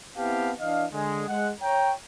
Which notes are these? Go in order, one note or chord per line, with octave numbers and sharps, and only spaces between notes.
B3 C4 E4 G4 F5 A5
E3 D4 D#5 F5
D3 G#3
G#3 F#5
C#5 G5 A#5